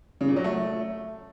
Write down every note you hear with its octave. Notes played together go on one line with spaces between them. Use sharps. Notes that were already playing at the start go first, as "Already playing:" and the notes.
C#3
A#2
F#3
A3